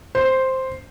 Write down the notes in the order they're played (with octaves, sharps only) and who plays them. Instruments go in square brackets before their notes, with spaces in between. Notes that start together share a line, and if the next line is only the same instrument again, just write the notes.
[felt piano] C5